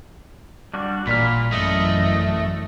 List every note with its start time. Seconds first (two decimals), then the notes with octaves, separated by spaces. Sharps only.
0.74 G3 D4 F#4
1.07 A1 A#2 D5 B5 F6
1.52 F#2 E3 A3 D#5